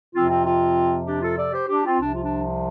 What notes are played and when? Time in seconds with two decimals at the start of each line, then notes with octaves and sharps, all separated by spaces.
0.14 F2 C3 F3 C4 F4
0.30 C4 F4
0.45 C4 F4
1.07 D4 G4
1.22 F4 A4
1.38 A4 D5
1.53 G4 C5
1.68 D4 G4
1.85 C4 F4
1.99 C2 C3 F3 D4
2.14 F4
2.23 D4